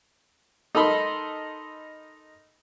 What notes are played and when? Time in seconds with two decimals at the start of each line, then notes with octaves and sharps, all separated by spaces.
0.75 D#4 A4 A#4 D#5 B5 C6